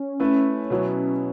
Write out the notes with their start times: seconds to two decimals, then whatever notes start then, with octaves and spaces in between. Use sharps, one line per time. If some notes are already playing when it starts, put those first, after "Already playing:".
Already playing: C#4
0.20 A3 E4 B4
0.70 B2 F#3 B3 C#4 E4